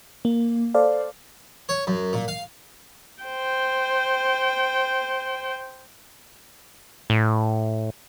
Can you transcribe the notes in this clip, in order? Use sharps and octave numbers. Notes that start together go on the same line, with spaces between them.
A#3
A4 C5 D5 F5
C#5
F#2
A#2
F5
C5 G5
A2